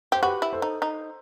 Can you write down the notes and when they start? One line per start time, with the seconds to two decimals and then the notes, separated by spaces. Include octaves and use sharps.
0.12 G4 C5
0.23 F#4 G4 B4
0.42 E4
0.53 A4 C5
0.62 D#4
0.82 D#4